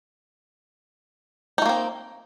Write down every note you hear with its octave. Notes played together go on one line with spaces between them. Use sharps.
A3 A#3 C4 D#4